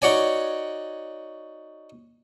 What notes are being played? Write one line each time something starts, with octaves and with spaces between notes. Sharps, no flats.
D#4 F#4 C#5 D5 G#5